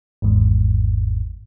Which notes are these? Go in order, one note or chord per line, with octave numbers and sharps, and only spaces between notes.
G#1 E2 G#2